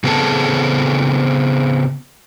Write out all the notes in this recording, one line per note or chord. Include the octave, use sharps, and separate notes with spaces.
C#3 B3 C4 G#4 A4 A5